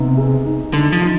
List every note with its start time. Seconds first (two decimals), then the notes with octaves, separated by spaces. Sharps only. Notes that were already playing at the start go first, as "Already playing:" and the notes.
Already playing: C3 B3 D#4
0.17 G#4
0.45 D#4
0.73 D3 D#4
0.92 F3
1.02 D#4